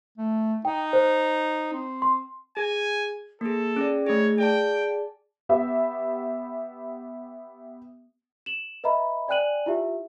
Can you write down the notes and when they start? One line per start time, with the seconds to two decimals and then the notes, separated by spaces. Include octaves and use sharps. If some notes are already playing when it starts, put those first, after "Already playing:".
0.18 A3
0.65 D#4 G5
0.93 C5
1.73 C4
2.02 C6
2.57 G#4 G#5
3.41 A#3 G#4 A4
3.76 C#4 G#4 D5
4.06 A3 D#4 G#4 C#5
4.38 G#4 D5 G5 A5
5.49 B3 G4 E5
8.46 E7 F#7
8.84 B4 D#5 E5 A#5 B5
9.28 D5 G5 G#5 F#6 D#7 F#7
9.66 E4 F4 G4 E5